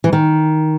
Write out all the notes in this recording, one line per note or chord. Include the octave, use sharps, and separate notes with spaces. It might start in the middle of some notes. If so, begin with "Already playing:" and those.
E3
D#3